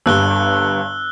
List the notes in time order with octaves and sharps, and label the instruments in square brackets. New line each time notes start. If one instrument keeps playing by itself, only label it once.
[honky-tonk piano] G1 G2 G3 [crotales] E6 F#6 G7